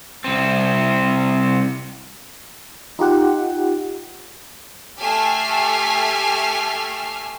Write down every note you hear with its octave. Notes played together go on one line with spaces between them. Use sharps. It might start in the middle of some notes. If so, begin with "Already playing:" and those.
C2 C4
D#4 F4 G4 F#5
A3 G4 A4 G#5 F6 C7